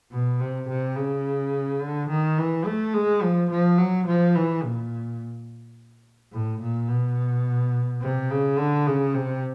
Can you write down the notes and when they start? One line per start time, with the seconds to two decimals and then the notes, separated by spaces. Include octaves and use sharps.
0.12 B2
0.40 C3
0.69 C3
0.96 C#3
1.81 D3
2.09 D#3
2.38 E3
2.66 A3
2.94 G#3
3.23 F3
3.50 F3
3.78 F#3
4.07 F3
4.36 E3
4.64 A#2
6.32 A2
6.61 A#2
6.89 B2
8.02 C3
8.30 C#3
8.57 D3
8.86 C#3
9.14 C3